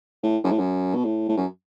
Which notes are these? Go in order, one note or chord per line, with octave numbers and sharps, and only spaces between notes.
A2
F#2
A2
F#2
B2
A2
A2
F#2